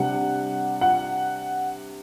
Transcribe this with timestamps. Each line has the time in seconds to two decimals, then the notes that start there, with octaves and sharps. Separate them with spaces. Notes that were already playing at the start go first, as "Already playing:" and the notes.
Already playing: C3 G3 D4 F#5
0.81 F#5